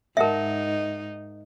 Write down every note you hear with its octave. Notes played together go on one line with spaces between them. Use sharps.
G#2 D#4 A#4 D#5 E5 F#5 A5